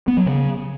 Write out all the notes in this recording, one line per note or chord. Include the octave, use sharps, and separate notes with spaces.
B3
F#3
C#3